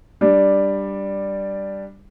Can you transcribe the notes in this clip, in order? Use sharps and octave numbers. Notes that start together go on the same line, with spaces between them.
G3 D4